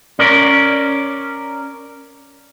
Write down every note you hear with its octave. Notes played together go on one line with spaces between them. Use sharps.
C#4 A#4 D5